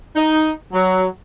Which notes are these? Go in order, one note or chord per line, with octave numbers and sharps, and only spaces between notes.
D#4
F#3